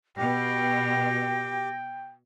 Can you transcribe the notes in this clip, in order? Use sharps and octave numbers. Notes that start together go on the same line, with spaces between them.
B2 G4 G5 A#6